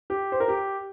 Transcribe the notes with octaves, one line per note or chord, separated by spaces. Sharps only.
G4
C5
A#4
G4